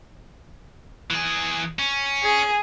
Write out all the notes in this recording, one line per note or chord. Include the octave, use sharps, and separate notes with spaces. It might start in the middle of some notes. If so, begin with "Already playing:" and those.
E3 G#4
C#4
G#4